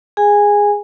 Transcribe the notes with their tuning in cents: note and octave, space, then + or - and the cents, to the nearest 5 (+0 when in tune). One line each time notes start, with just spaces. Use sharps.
G#4 -10 G#5 -15